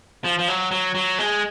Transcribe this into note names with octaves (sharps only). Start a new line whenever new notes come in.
F3
F3
F#3
F#3
F#3
G#3